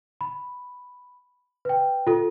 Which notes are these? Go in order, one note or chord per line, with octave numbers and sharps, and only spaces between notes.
B5
B4 G5
F4 A4